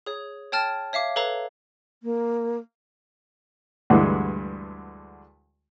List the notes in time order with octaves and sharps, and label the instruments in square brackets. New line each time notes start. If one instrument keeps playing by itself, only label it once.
[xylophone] G#4 C#5
C#5 G5 A5 F6 A6
C#5 E5 F5 D6
A4 B4 C#5 F5 A#5
[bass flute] A#3
[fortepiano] D2 G2 D3 E3 G#3